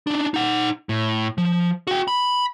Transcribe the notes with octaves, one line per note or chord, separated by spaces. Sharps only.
D4 D#4
D#4 F#5
A2
F3
F#4 G5
B5